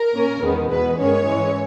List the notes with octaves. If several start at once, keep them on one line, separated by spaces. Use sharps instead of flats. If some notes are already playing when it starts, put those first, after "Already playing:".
Already playing: A#4
A#2 A#3 C#4
E2 D#3 G#3 B3
E2 B2 G#3 B3 B4
G2 D#3 G#3 C#4 C#5
G#2 E3 G#3 C#4